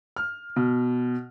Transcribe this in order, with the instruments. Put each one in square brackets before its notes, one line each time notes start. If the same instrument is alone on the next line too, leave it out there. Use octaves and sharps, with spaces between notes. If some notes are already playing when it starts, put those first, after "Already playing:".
[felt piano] F6
B2